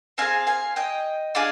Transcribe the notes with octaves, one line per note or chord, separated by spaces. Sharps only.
C4 D#4 G#4 F5 G#5
F5 G#5
D#5 G5
D4 F4 G#4